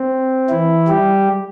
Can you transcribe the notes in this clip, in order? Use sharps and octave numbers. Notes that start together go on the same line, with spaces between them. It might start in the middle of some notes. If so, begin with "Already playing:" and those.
Already playing: C4
E3 E4
G3 G4